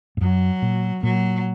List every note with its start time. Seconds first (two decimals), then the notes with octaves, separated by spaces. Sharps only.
0.17 G2
0.21 F#2 F#3
0.62 A#2
1.03 A#2 F#3